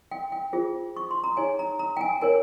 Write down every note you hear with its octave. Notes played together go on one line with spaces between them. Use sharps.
G5
G5
F4 G#4 C5
C#6
C6
A#5
D#4 G#4 C#5 G#5
A#5
A#5
G5
G#5
D#4 A#4 C#5 G#5